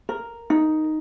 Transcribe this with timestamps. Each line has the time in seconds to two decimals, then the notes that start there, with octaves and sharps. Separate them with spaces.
0.09 A#4
0.50 D#4